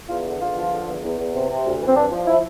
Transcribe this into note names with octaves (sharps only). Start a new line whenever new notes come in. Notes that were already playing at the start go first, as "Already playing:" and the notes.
E2 F4
D3
E2 F4
F3
D3
E2
E2
E2
C3
C3
D2
E3
C4
G2 D4
F3
F3 E4